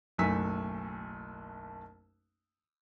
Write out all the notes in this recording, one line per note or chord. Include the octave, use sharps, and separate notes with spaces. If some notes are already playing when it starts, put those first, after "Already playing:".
F#1 B1 A3 G#5 E6 B6